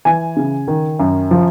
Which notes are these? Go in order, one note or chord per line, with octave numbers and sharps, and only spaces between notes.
E3 G#5
C#3
D#3
F#2
F3